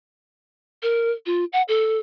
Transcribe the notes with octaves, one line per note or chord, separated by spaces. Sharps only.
A#4
F4
F#5
A4